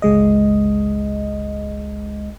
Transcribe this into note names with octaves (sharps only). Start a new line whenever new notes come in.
G1 C#2 G#3 D#5